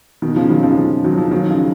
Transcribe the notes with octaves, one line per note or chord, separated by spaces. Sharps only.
B2 D#3
C#3 F3
D#3 F#3
C#3 F3
C#3 F3
D#3 F#3
C#3 F3
D#3 F#3
C#3 F3